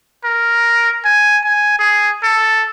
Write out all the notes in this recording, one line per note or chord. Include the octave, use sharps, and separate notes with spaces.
A#4
G#5
G#5
G#4
A4